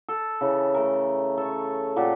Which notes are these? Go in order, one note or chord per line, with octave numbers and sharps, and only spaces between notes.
A4
C#3 E3
A3 A#4
A4 C#5
A#2 G4 F#5 A5